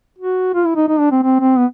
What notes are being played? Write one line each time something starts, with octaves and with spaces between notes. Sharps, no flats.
F#4
F4
E4
D#4
D#4
D4
C4
C4
C4
B3